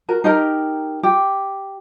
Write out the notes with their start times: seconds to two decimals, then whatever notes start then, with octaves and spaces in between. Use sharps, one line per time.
0.09 F#4 A#4
0.24 D#4 G4 A#4
1.03 G4